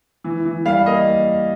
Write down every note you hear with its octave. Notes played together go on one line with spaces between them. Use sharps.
E3
E3
G3 F5
A#3 D#5